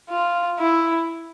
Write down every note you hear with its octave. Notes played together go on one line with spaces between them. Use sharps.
F4
E4